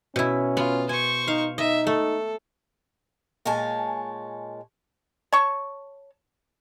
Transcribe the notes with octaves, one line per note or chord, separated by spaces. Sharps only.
B2 C#4 E4
B3 F4
C5 G#5 C#6
D#4 F5
D#4 D#5 E5
A3 A4
A#2 G#3 C#5 G#5 A5
C#5 A5 C#6